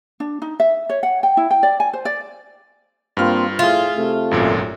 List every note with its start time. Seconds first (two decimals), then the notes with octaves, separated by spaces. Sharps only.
0.20 D4
0.42 D#4
0.60 E5
0.89 C#5
1.03 F#5
1.23 G5
1.37 E4
1.51 G5
1.63 D5
1.80 G#5
1.93 C5
2.05 D5
3.17 G2 A#3 C4 F4 F6
3.59 A2 F3 F4 G#4 E5
3.96 C3 A3
4.31 G#1 F#2 A#2